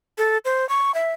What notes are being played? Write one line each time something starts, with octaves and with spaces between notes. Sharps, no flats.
A4
C5
C#6
E5